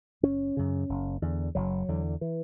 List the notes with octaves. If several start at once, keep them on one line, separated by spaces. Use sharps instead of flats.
F#1 C#4
F#2 C#3
F#1
E2 D3
F#1 F#3
E2 D3
E3